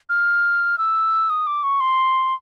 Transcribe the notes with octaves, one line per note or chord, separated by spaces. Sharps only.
F6
E6
D#6
D6
C#6
C6